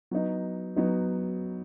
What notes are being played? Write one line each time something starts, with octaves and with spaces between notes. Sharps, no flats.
F#3 B3 D#4
F#3 B3 D#4